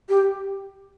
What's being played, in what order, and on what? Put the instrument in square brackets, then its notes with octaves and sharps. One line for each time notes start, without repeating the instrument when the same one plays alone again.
[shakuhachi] G4